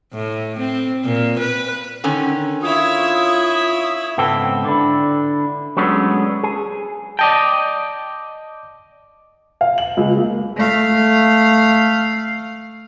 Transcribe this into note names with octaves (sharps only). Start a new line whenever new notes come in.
A2
C4
A#2
B4
D3 D#3 C#4
E4 F4 C#5 D#6
C#2 G#2 B3 C4 A4 G5
D3 D4 E4
F#3 G#3 A3 B3 C#4 D4
G#4
D5 D#5 G5 A5
F5
F#7
C#2
A#3
A3 F5